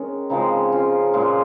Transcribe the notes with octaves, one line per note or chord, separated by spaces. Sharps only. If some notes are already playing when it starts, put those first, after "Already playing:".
Already playing: D#3 G#3 C#4
C#3 F3 G#3 C4 D#4
C#4 F4
A#2 G#3 F4 G#4